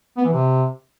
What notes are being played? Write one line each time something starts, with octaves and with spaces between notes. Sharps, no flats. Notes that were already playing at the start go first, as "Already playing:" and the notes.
B3
E3
C3